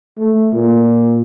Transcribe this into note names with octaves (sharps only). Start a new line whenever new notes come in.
A3
A#2